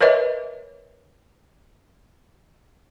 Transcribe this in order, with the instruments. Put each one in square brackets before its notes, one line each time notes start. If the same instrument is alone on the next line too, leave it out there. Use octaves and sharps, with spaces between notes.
[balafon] A#4 B4 C#5 D#5 E5